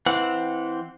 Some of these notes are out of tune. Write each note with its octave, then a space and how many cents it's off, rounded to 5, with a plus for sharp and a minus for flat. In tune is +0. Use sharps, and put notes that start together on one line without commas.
E3 +0 C4 +0 F#5 -20